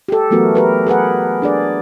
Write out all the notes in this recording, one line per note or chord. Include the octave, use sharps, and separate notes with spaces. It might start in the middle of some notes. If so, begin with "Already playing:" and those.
G4 A4
E3 F#3 A3 B3 F#4 A#4
G4 A#4 B4
G#4 A#4 B4 F#5
D4 G#4 D5